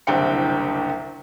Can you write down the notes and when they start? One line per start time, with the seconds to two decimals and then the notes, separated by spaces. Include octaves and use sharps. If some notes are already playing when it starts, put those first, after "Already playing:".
0.07 F#1 C2 D3 C4 G5 C#7